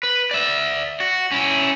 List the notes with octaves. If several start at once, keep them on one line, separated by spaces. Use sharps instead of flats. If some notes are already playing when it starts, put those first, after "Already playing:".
B4
D5 E5
F#4
C#4 E4